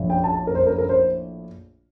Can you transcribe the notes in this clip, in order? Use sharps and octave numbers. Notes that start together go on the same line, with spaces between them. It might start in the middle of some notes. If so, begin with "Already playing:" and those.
Already playing: A#1 A2 F3 A3 E4
G5
A5
A#4
C5
A#4
A#4
C5